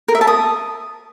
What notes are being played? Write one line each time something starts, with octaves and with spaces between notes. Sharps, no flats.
A#4
E5
A5
D#6